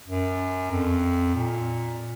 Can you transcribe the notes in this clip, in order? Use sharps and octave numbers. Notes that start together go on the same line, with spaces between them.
F#2
F2
A#2